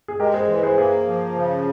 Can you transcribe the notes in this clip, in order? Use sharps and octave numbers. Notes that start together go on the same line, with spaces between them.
G#4
G#3 G4 A#4
G#4 C5
E3
G#4 C5
A#3 G#4 C5
F3
C#3